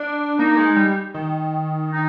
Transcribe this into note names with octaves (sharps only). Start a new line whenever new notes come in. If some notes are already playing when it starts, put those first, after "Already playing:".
Already playing: D4
A#3 D#4
G#3
G3
D#3
D#4